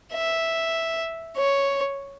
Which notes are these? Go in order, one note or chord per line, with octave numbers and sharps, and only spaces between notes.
E5
C#5